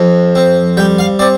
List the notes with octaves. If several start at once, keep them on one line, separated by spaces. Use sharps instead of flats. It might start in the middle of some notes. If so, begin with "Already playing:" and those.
Already playing: F2 F3
C4
G3 G5
F5
C4 D5